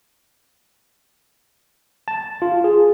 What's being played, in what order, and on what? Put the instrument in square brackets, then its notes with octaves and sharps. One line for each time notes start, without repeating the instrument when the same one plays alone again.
[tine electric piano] A5
F4
G#4